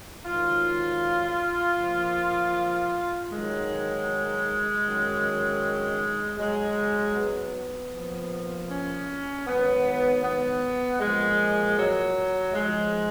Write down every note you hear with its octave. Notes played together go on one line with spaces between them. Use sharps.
G#2 D#3 F#3 F4
A#2 F3
G#2 D#3 F#3 G#3
F#2 D#3 F#3
G#2 F#3 G#3
B3
A#2 F3
C#4
G#2 D#3 F#3 B3
B3
A#2 F3 G#3
F#3
G#2 F3 G#3